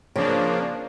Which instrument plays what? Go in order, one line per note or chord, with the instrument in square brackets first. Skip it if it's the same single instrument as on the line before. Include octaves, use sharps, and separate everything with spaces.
[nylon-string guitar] C#3 [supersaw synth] F3 A#3 D4